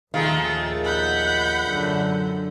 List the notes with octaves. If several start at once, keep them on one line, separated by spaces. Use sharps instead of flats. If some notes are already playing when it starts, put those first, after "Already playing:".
A#1 D#2 D#3 A3 F4 G#4 F5
F#5 B5 G6
F#2 D3